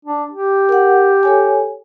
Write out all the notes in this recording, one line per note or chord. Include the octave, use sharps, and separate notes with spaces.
D4
G4
A#4 F#5
A4 C#5 G#5